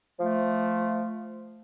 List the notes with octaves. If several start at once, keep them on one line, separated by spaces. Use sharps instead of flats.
F3 A3